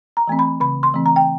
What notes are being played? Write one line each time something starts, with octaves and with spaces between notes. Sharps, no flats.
A#5
E3 A3 C4
B5
C#3 B5
C6
E3 A3 C4
A#5
G5